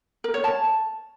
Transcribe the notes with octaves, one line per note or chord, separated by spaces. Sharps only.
A#4
C#5
A5